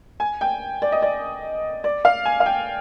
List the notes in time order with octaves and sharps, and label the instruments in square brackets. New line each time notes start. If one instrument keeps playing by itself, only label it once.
[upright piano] G#5
G5
D5
D#5
D5
D5
F5
G#5
F5
G5